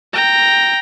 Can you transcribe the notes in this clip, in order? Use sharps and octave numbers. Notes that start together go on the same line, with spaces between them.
G5 A#5